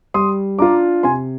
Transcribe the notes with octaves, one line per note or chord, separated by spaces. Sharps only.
G3 C6 D#6
D4 F4 A#5 D6
C3 G#5 C6